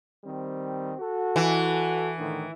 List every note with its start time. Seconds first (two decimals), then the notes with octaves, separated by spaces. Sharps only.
0.24 D#3 G3 C4
0.98 F#4 A4
1.36 E3
2.18 A2 D3 D#3